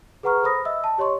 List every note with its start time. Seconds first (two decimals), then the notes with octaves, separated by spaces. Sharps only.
0.23 G#4 B4 F#5 A#5 C#6 F6
0.43 A4 C5 B5 D#6 A#6
0.65 D#5 E5 E6
0.84 A5
0.98 G4 C#5 D#5 C6 C#6